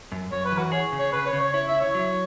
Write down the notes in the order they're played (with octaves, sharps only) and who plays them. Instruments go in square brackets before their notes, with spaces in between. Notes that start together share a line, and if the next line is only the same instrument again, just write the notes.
[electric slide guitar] F#2
[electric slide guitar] F#2 [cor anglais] C#5
[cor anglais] B4
[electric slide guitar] E3
[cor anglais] F#4
[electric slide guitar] G#4 [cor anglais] C#5
[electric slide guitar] C#3
[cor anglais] C#5
[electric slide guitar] C#3 [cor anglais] B4
[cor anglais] C#5
[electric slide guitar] C#3
[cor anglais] C#5
[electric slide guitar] E4 [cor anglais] C#5
[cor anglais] E5
[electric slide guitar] E4
[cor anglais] C#5
[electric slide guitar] F#3